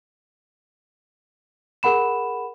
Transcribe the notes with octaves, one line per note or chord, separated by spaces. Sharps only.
G#4 A#4 F#5 B5 E7